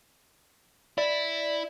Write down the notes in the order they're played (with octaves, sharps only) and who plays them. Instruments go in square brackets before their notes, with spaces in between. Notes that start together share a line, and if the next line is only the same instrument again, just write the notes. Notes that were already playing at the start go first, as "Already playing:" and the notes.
[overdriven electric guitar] E4 [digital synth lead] D5